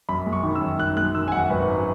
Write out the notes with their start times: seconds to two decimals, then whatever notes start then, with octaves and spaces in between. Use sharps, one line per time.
0.09 F#2 B5
0.26 G#3
0.33 C#6
0.43 D#3
0.55 E6
0.62 F#2
0.79 F#2 F#6
0.97 G#3 F#6
1.15 D#3 E6
1.28 G#5
1.32 F#2 F#5
1.50 G#1 B4
1.68 F#3